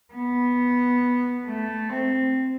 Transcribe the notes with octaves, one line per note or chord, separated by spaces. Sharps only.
B3
A3
C4